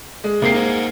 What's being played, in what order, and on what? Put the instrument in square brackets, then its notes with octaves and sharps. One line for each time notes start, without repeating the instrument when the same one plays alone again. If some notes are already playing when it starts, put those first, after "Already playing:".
[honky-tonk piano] G#3
[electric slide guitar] C3 C4 G4 [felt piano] A#3 C7
[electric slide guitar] D#4 C5